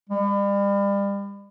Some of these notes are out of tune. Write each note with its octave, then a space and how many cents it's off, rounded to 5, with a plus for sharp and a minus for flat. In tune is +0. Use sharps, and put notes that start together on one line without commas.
G3 +35